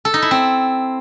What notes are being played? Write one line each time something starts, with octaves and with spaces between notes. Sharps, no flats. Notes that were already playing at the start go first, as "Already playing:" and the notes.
A4
D#4
E4
C4